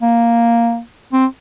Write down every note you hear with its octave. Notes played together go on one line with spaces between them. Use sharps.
A#3
C4